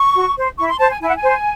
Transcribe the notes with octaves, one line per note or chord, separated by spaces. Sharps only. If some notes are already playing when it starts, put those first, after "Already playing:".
Already playing: C#6
F#4
C5
E4 C#6
C6
C5 A5
G#5
E4 G#5
F#5
G#5
C5